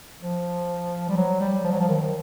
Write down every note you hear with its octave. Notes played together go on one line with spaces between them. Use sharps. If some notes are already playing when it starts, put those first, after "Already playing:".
F3
G3
F#3
G3
F3
F#3
F3
D#3